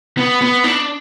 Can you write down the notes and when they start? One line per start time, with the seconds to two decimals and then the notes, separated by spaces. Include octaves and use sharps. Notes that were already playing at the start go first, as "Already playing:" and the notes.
0.17 B3
0.42 B3
0.64 D4